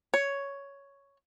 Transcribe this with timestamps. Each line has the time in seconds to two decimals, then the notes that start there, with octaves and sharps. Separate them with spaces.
0.14 C#5